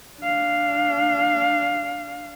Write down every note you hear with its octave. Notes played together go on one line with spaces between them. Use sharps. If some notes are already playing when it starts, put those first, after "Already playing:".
D4 F5